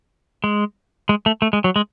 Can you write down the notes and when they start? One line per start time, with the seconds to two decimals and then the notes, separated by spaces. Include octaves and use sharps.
0.44 G#3
1.09 G#3
1.26 A3
1.42 A3
1.53 G#3
1.64 F#3
1.76 G#3